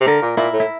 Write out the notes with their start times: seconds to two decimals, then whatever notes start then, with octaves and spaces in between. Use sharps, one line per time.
0.01 C3
0.06 D3 A#4
0.22 A#2
0.37 A#2 E4
0.54 A2
0.60 E4